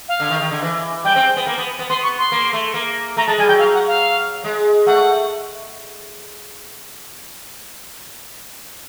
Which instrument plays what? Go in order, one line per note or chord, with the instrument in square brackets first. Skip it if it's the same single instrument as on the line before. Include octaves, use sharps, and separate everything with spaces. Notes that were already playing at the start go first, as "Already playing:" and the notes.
[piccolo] F5
[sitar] D3
D#3
D#3
D3
E3
[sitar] G3 [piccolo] G5
[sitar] C4
B3
A#3
B3
B3
[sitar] B3 [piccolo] C6
[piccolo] C#6
C6
[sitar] A#3
A3
A#3
[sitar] A3 [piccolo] A#5
[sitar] G#3 [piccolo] A5
[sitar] G3 [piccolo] G#5
[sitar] F#3 [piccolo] G5
[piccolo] F5
F#5
F5
[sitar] G#3
[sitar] A3 [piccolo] F#5